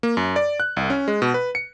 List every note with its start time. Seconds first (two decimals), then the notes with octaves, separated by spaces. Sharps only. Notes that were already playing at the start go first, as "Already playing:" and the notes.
0.03 A#3
0.17 F#2
0.36 D5
0.60 F#6
0.77 C2
0.90 C#4
1.08 G#3
1.22 B2
1.34 B4
1.55 C#7